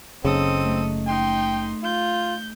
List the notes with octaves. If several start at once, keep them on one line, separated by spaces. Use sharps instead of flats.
F#1 C#3 C4 D#4 A4 D#5 D#6
A3
D#4 G5 C6
F4 G6